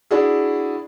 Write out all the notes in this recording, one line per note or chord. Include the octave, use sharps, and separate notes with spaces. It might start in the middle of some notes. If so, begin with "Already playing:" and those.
D4 E4 F#4 G#4